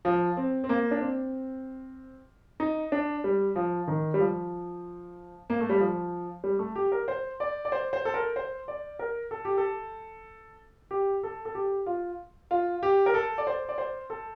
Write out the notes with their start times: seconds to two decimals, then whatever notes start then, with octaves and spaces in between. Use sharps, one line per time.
0.05 F3
0.37 C4
0.64 C4
0.69 A#3
0.91 D4
1.01 C4
2.60 D#4
2.92 D4
3.24 G3
3.56 F3
3.88 D#3
4.14 G3
4.20 F3
5.50 A#3
5.61 A3
5.70 G3
5.80 F3
6.44 G3
6.59 A3
6.76 G4
6.92 A#4
7.08 C5
7.40 D5
7.65 D5
7.72 C5
7.93 C5
8.05 A4
8.14 A#4
8.36 C5
8.68 D5
8.99 A#4
9.31 A4
9.45 G4
9.57 A4
10.91 G4
11.23 A4
11.45 A4
11.55 G4
11.86 F4
12.51 F4
12.83 G4
13.06 A#4
13.14 A4
13.38 D5
13.47 C5
13.69 D5
13.78 C5
14.10 A4